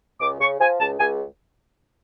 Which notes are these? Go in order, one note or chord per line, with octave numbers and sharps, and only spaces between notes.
C#2 D6
C#3 C#6
F3 G#5
C#2 A5
C#2 G#5